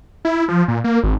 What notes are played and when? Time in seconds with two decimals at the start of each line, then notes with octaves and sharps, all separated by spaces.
0.25 E4
0.48 F3
0.68 A#2
0.84 A#3
1.03 G#1